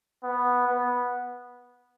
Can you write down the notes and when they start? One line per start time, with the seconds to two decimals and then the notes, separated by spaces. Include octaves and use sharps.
0.24 B3
0.66 B3